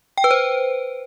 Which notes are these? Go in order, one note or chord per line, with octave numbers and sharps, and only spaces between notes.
G5
B4
C5